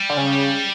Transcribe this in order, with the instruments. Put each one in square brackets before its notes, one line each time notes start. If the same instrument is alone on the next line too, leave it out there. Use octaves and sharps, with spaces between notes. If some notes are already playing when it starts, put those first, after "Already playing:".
Already playing: [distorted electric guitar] G3
[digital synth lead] D3
C#3